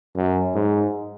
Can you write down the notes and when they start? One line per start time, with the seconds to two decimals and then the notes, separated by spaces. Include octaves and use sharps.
0.16 F#2
0.55 G#2